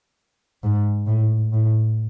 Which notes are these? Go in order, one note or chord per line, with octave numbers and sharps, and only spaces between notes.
G#2
A2
A2